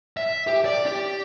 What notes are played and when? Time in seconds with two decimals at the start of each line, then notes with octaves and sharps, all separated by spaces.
0.17 E5
0.47 G4
0.65 D5
0.86 G4